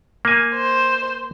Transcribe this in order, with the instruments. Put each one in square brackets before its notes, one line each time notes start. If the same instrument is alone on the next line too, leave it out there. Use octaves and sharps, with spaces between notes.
[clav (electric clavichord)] A#3 G#5
[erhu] C5